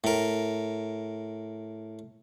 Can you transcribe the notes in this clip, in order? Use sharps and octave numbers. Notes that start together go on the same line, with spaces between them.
A2 A#4